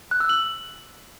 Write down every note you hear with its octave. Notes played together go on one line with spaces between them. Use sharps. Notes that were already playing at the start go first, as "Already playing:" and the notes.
F#6
E6
F#7